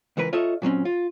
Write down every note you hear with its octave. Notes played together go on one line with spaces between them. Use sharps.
C#2 E3 A#4 B4
F4 A4 C#5 D#5 E5
A#2 F#3 C4 C#4
F4